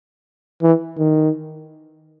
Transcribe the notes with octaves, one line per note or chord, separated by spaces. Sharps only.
E3
D#3